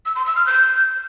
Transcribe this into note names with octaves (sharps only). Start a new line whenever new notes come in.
E6
C6
E6
F6
G6